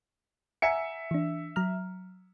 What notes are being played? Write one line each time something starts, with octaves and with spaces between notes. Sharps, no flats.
E5 F#5 G#5 A#5 C#7
E3 D4
F#3 A#5 F6